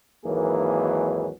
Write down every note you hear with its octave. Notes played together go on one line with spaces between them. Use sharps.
G#1 D#2 E3 F#3 A#3 G#4